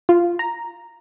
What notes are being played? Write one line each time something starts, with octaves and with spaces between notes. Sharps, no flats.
F4
A#5